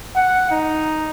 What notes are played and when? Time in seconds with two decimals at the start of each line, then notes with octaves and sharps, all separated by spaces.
0.16 F#5
0.51 D#4